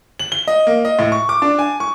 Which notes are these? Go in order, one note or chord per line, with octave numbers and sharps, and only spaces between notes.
F#7
G7
D#5
A#3
D#5
A2
C#6
D6
D4
G#5
C#6